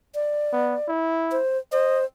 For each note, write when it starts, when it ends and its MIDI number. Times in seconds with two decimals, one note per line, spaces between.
0.15 0.90 74
0.53 0.75 59
0.88 1.41 64
1.32 1.58 72
1.72 2.04 72
1.72 2.02 75